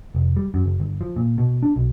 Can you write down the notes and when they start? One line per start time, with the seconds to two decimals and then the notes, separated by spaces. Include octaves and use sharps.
0.15 F1
0.37 G3
0.54 F#2
0.66 F#1
0.80 G1
1.01 F3
1.16 A#2
1.38 B2
1.63 D4
1.76 B1